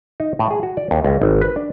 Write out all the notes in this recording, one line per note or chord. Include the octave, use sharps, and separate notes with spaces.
D#4
A2
G#4
F#4
D5
D#2
C#2
G#1
B4
D4